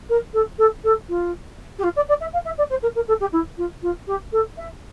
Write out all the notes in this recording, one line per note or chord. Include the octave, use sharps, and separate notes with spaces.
A#4
A4
A4
A4
F4
G4
F4
D5
D5
E5
F5
E5
D5
C5
A#4
A#4
A4
G4
E4
F4
F4
G4
A4
E5